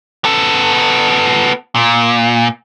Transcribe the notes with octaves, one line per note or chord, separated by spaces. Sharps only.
B3 A4
A#2